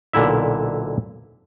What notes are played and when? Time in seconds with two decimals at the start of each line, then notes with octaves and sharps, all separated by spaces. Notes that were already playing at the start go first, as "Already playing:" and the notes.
0.13 B1 A#2 D3 E4 E5